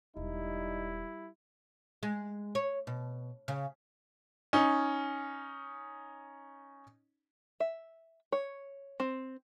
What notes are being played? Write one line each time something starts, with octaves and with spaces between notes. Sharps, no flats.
E1 G3 D#4 E4
G#3
C#5
B2
C#3
C#4 D#4
E5
C#5
C4